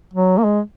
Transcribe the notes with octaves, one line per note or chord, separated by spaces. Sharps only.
F#3
A#3
G#3